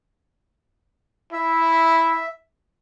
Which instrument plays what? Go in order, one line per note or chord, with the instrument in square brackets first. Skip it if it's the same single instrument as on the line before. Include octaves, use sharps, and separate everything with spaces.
[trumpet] E4 [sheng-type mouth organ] E5